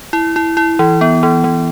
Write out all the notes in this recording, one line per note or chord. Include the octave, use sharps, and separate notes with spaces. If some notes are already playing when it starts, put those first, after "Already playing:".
E4
E4
E4
E3
B3
E3
E3